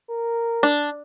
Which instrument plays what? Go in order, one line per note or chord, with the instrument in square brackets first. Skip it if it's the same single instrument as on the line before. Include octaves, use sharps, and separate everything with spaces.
[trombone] A#4
[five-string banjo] D4